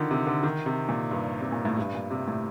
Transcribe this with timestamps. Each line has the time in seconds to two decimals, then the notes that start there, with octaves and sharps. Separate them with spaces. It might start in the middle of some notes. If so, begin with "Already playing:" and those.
Already playing: D3 D#3 F3
0.11 C3
0.27 D3
0.43 D#3
0.66 C3
0.89 A#2
1.11 G2
1.41 C3
1.52 A#2
1.65 A2
1.78 G2
1.95 A#2
2.10 C3
2.28 A2